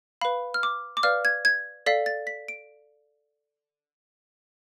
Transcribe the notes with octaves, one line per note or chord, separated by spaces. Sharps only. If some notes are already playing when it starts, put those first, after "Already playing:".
B4 F5 B5
F6
D6
D6
B4 D5 F5 F6
G#6
G#6
A4 D5 F5 B6
A6
B6
D7